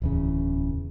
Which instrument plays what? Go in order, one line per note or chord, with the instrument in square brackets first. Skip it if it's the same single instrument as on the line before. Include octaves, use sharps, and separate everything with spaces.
[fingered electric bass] D1 E2 C#3